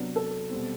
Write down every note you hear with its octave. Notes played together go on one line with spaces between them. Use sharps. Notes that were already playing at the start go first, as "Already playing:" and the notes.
Already playing: C3 F#3 B3 D4
A4
B2 G3 C4